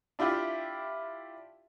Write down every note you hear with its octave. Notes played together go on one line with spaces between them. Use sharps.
D4 E4 F4 G4 E5